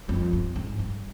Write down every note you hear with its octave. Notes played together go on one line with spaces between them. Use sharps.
F2
G2
G#2
G2